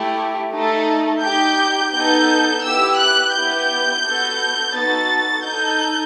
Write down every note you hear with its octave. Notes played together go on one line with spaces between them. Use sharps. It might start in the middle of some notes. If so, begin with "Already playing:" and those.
Already playing: A3 E4 G4
A3 D#4 A4
D#4 G4 G6
B3 D#4 A4 G6
B3 E4 G4 E6
F#6
B3 E4 G4 G6
B3 F#4 A4
B3 D#4 F#4 A4 A6
D#4 A4 G6